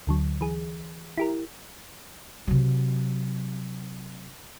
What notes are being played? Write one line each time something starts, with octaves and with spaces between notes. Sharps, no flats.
D2 D3 F#3
E3 G#4
E4 G4 A#4
C3 F#3